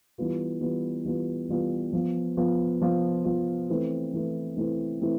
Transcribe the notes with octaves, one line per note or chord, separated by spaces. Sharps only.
E3 G3 B3 F4 B4
E3 G3 B3 F4 B4
E3 G3 B3 F4 B4
E3 G3 B3 F4 B4
F3 B3 F4
F3 B3 F4
F3 B3 F4
F3 B3 F4
E3 A3 C4 E4 B4
E3 A3 C4 E4 B4
E3 A3 C4 E4 B4
E3 A3 C4 E4 B4